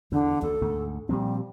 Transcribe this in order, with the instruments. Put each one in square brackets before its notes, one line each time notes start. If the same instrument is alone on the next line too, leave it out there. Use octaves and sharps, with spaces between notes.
[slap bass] E2 [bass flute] D3
[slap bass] D2 [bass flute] A4
[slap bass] D2 G#2
[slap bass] A#2 F3 C4 [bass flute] G3